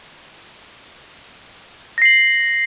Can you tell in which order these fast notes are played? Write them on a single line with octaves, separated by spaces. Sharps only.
A#6 C7 F#7